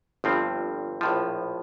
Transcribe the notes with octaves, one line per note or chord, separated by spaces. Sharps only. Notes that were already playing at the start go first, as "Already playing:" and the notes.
G1 G2 F3 C4
A#1 A2 F3